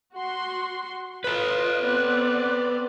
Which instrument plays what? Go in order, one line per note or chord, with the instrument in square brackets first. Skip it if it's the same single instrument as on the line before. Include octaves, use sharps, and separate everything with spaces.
[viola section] F#4 C6 [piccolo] F#5
[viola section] F4 D#5 [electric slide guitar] A4 B4 [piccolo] F#6
[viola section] B3 C4 D5